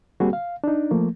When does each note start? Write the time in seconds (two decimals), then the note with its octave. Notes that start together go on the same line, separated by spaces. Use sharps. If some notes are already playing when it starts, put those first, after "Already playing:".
0.20 G3 A#3 C4 F#4 G#4
0.33 F5
0.64 D4 D#4
0.91 F3 A3 A#3